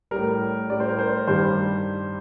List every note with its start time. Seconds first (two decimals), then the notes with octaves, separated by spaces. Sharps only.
0.11 A2 G3 A#4
0.69 A2 G3 D5
0.80 C5
0.89 A#4
0.99 C5
1.27 G2 D#3 G3 C5